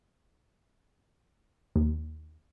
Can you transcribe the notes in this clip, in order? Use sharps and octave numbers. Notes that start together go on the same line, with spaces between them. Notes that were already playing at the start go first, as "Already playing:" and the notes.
D#2